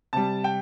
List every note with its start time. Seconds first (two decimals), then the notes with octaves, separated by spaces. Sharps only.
0.13 C3 G3 A5
0.44 G5